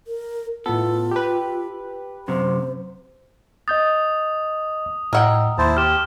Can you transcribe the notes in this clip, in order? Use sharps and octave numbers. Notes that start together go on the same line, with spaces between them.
A#4
A2 B3 F4 A4
G4 B4
F#2 C3 C5
D#5 D#6 G6 A6
A2 A#4 D#5 F#5 G5 E6
D#2 E4 C5 A5
G4 F6 E7